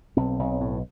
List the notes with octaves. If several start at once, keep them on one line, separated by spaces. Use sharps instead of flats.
B1 C4
B1
A2